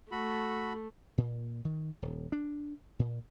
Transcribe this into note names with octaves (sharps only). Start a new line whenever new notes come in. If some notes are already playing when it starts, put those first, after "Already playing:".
A3 F#4 A4 B5
A#2
D#3
D#1
D4
A#2